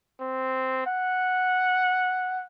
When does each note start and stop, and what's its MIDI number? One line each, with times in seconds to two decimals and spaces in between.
0.21 0.86 60
0.87 2.43 78